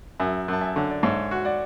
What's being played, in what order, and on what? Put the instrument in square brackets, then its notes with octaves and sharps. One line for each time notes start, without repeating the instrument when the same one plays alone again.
[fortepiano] F#2 [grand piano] E5 G#5
[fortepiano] F#2 [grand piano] A5
[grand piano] E5 G#5
[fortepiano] D3 [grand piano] C#5
[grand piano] D5
[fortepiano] G#2 [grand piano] C#5 E5
[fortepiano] F#4
[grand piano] D5 F#5